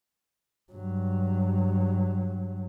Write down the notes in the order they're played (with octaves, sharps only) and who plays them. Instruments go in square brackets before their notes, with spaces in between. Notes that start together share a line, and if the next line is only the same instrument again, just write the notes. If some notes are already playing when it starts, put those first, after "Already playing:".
[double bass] G2 F#3